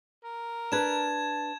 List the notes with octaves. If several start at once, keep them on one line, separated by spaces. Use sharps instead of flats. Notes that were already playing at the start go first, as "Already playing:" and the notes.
A#4
D4 B4 A5 G#6 E7